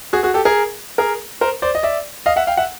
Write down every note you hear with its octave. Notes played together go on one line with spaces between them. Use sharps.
F#4 G#4
F#4 G#4
G4 A4
G#4 A#4
G#4 A#4
A#4 C5
C5 D5
D#5
D5 E5
D#5 F5
E5 F#5
F5 G5
E5 F#5